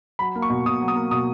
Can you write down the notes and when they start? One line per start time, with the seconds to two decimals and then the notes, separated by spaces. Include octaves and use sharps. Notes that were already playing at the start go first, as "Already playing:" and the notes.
0.19 F#3 B5
0.36 A#3
0.42 C#6
0.50 B2
0.66 B2 D#6
0.81 F#3
0.88 D#6
0.95 A#3
1.11 B2 D#6